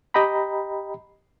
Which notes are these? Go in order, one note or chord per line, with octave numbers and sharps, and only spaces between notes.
G4 D#5 G5 A#5 B5